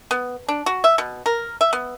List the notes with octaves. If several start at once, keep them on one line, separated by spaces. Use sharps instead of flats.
B3
D4
F#4
E5
B2
A#4
E5
B3